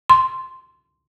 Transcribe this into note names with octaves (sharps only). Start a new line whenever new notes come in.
C6